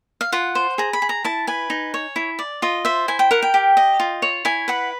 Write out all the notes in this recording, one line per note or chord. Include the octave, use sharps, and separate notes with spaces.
F5
F4 F#5
C5
G#4 A#5
B5
G#4
A#5
E4 A5
B4 G#5
D#4
C#5
E4
D5
F4 D#5
C5 E5
E4 G#5
G5
A#4 F#5
G5
G4
D#5
F4
C#5
E4 G#5
B4 F#5